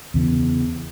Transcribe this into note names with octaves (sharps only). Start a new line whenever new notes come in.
E2 C#3 E3